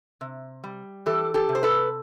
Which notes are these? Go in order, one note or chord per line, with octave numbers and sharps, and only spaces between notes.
C3
G3
E3 G4 A4
G4 A4
C3
C5
A4 B4